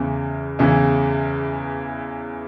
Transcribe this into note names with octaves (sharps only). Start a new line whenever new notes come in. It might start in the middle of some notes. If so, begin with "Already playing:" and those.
Already playing: E2 C#3 E3
E2 C#3 E3